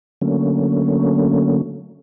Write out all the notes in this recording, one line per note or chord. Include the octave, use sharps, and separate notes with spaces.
D3 F#3 A3 A#3 C#4